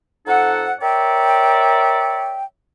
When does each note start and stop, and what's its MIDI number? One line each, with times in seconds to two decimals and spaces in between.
0.27 0.71 41
0.27 0.71 63
0.27 0.71 69
0.27 0.71 78
0.80 2.43 70
0.80 2.43 73
0.80 2.43 74
0.80 2.43 76
0.80 2.43 79